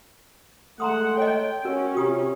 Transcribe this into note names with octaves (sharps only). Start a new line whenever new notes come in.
G#3 A3 F#5 A#5 C6 D#6
C#5 D#5 G5
C#4 F#4 A#4
C3 F4 G4 D#6